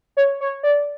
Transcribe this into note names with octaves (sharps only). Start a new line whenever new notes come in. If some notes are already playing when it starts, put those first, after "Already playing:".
C#5
C#5
D5